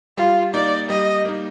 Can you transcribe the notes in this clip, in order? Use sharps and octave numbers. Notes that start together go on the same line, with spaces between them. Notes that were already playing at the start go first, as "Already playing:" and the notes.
G3 F4
A#3 D#4 D5
G3 D#5
A#3 D#4